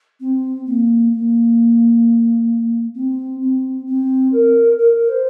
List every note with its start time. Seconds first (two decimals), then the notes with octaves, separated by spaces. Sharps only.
0.20 C4
0.66 A#3
1.13 A#3
2.95 C4
3.42 C4
3.87 C4
4.32 A#4
4.79 A#4
5.09 C5